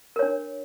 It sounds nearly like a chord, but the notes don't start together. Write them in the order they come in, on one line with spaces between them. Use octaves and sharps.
A#4 C#5 D4